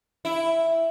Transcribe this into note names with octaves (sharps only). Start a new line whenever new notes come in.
E4